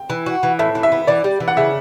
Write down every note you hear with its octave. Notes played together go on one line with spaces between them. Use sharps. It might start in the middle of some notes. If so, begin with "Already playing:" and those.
Already playing: G5
E3
F#4
E3
A2 E5
E3
E5
B3
E3 D5
G3
E3
F#5
C#3 E5